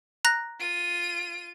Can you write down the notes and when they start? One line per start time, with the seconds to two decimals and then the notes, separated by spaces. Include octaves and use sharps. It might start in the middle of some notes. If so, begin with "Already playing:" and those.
0.25 A#5 F#6 A#6
0.59 F4 D#7